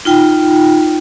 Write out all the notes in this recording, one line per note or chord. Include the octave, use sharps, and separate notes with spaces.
D#4 F4 G5